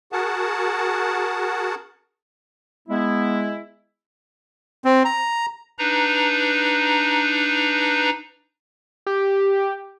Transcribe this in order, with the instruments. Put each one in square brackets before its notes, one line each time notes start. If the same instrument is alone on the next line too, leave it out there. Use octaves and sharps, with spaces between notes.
[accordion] F#4 G#4 A#4 F#5 A5
[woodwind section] G#3 B3 E4
[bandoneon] C4
A#5
[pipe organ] D4 D#4 B4 A#5
[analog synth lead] G4